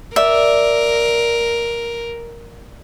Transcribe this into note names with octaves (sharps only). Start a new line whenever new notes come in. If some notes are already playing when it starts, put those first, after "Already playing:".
A#4 D5 E5